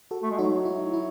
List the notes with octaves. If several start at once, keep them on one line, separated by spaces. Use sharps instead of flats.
F#4 A4
A3
G#3
F#3 D#4 F#4
E4
E4